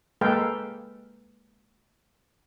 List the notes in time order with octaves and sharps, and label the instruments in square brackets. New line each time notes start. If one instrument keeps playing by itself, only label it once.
[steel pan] G#3 A#3 A4 B4 F5 G5